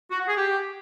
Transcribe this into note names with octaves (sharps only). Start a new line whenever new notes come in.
F#4
F#5
G#4
G4